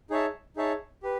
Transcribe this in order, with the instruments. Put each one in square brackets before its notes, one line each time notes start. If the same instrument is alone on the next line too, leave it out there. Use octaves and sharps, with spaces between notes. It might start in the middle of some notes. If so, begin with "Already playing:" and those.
[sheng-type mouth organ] D#4 G#4 C#5 E5 A5
D#4 G#4 C#5 E5 A5
G4 B4